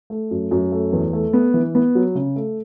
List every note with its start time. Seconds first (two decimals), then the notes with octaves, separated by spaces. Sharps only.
0.10 A3
0.31 F#2
0.51 F#2
0.72 A3
0.93 E2
1.13 A3
1.33 B3
1.54 E3
1.75 B3
1.95 F#3
2.15 C#3
2.36 A3